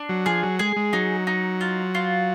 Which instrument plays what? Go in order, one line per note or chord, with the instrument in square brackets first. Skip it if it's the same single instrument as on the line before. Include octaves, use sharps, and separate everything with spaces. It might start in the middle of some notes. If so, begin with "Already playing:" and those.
Already playing: [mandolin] D4
[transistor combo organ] F#3
[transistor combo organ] F3 [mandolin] G#4
[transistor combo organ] F#3
[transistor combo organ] G#3 [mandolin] G#4
[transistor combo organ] G#3
[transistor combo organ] F#3 [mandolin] D#4
[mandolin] D#4
F4
F4